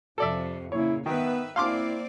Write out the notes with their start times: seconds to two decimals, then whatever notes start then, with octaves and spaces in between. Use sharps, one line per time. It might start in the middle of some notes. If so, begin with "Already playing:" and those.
0.18 F2 C3 F3 A4 D5 E5
0.72 A#2 C#3 E4 C#5
1.06 D#3 B3 B4 E5
1.56 A#3 C4 E4 D5 F5 C6 D6